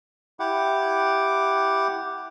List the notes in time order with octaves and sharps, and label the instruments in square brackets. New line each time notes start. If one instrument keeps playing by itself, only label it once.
[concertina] E4 G4 F#5 D6